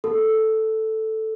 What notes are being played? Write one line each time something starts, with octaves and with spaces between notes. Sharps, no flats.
A4